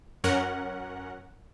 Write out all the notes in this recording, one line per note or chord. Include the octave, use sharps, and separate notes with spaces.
F#2 C#4 A#4 F#5